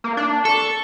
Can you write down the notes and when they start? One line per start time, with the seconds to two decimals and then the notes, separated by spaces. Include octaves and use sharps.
0.04 A#3
0.17 D4
0.45 A4 C#6